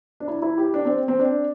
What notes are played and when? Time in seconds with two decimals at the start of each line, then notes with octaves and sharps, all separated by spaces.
0.20 D4
0.28 E4
0.42 E4
0.58 G4
0.74 D4
0.85 C4
1.08 C4
1.19 D4